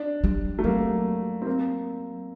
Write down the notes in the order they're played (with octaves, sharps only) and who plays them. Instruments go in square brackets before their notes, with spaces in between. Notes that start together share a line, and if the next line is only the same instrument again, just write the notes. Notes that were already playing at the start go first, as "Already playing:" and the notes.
Already playing: [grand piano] D4
[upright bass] G3
[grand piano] A3
[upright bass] F#3 [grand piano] A#3
[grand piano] C4
A#3